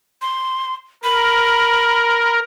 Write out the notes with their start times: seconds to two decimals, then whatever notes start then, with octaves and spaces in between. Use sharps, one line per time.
0.22 C6
1.04 A#4 B5